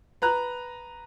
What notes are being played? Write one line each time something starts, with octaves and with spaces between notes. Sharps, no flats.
B4 A#5 F#6